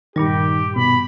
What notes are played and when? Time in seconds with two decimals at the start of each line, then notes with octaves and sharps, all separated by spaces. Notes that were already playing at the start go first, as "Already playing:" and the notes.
0.16 G2 A#2 D#3 G3 G4
0.76 B2 B5